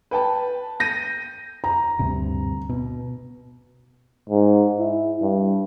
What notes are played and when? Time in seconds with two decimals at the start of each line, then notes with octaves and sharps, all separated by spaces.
0.11 B4 G5 A5
0.80 G6 A#6 D#7
1.64 A#5
1.99 D2 G2 C3
2.69 B2
4.30 G#2
4.79 E4
5.22 G2